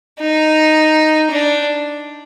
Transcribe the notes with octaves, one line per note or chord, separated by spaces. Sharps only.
D#4
D4